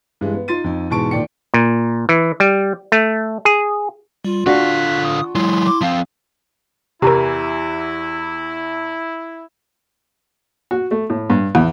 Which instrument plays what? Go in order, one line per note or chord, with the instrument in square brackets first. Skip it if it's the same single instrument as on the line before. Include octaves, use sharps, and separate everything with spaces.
[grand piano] G2 E3 G#3
B3
D#4 F4 C6 A6 D#7
F2 D#4
E2 G#2 B2 A5 C#6 D7
A#2 D#3 D5 G5 C#7
[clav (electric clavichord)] A#2
E3
G3
A3
G#4
[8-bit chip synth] G3 [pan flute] F4
[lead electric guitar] D3 F5 [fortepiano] D4 F#4 [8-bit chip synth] F#6 B6
[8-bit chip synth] D#6
[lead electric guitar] F#3 G#3 [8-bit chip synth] E4 C6
[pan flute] D6
[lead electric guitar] F3 C4 [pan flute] F5
[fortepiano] E2 E3 [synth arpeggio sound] C3 A#4 [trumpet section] E4 [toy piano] G4 A#5
[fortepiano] F#4
A3
A2
G2
E2